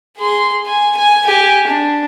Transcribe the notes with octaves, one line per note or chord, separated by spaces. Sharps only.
G#4 C6
G#5
G#5
G4 G#5
D4